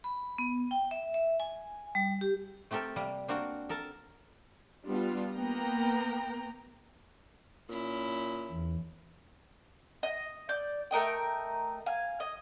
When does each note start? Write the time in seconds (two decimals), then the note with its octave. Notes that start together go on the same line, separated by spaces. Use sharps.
0.04 B5
0.38 B3
0.71 G5
0.91 E5
1.14 E5
1.40 G#5
1.95 G3
2.21 G4
2.71 A3 C4 G4 A4 A#4
2.96 C3 G3 A#3
3.28 A#3 C4 D4 F#4 A#4
3.69 A4 A#4 A5
4.86 G3 B3 D4 F4
5.36 A#3 B3 G5 A#5
7.69 A#2 C#4 E4
8.51 E2
10.03 D#5
10.49 D5 G6
10.91 A3 A#4 D#5 G5
11.86 F5 G#5
12.20 D#5